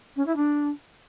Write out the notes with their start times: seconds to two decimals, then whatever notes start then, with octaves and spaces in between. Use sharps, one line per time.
0.16 C#4
0.26 E4
0.36 D4